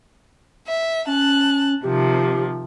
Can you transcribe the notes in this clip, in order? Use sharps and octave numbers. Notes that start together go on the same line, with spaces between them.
E5
C#4 A5 F#6
C3 D#3 F3 G4